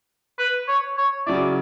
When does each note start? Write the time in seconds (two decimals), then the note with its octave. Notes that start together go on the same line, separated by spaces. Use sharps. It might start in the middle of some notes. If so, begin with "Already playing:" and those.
0.39 B4
0.68 C#5
0.97 C#5
1.27 C#3 F#3 C#4 E4 D5